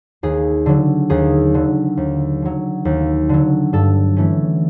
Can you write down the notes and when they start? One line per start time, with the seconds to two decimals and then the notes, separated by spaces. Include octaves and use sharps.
0.23 D#2 G#4
0.66 D3 F#3
1.10 D#2 G#4
1.54 D3 F#3
1.97 D#2
2.42 D3 F#3
2.85 D#2
3.29 D3 F#3
3.73 G2 A4
4.17 E3 A3 C#4